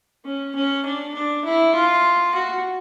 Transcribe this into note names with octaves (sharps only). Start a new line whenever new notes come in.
C#4
C#4
D4
D4
E4
F4
F#4